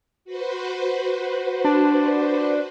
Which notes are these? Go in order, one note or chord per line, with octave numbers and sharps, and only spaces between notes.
F#4 B4 C5
D4